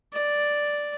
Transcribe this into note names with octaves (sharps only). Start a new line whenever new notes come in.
D5